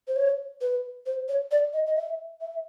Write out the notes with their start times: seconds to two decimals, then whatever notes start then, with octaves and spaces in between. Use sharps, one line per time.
0.08 C5
0.16 C#5
0.61 B4
1.06 C5
1.29 C#5
1.51 D5
1.73 D#5
1.86 D#5
1.96 E5
2.41 E5